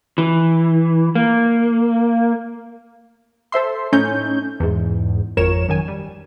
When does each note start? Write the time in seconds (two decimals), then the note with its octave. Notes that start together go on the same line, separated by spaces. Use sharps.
0.18 E3
1.15 A#3
3.52 A4 C5 E5 C6
3.92 A2 A3 C#4 D#4 G6
4.60 E2 G#2
5.37 G#1 F2 A#4 C#5 E7
5.69 F#2 D#3 G#5
5.88 G3